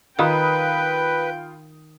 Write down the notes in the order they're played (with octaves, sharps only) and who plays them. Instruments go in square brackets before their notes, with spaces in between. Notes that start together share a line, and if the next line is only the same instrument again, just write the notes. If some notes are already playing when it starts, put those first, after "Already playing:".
[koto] D#3 [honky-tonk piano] F4 B5 D#6 [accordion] B4 [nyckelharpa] G5